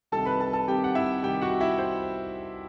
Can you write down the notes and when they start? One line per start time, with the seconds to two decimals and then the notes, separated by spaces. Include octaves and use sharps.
0.12 C2 C3 D#3 G3 A4 A5
0.25 B4 B5
0.40 A4 A5
0.53 A4 A5
0.67 C2 C3 D#3 G3 G4 G5
0.84 F#5
0.95 E4 E5
1.23 C2 C3 D#3 G3 G4 G5
1.41 F#4 F#5
1.60 E4 E5
1.79 C5